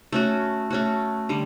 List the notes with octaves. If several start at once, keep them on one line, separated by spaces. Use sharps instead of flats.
A3 C#4 F#4
A3 C#4 F#4
D3 G3